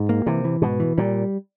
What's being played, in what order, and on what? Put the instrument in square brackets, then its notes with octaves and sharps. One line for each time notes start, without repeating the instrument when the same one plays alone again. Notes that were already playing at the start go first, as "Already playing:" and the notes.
Already playing: [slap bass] G#2
[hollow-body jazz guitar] A#3
[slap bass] C3 [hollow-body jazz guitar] E3
[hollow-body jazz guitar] E3
[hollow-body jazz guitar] G#2 [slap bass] B2
[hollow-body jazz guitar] E3
[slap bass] A#2 [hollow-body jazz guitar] G3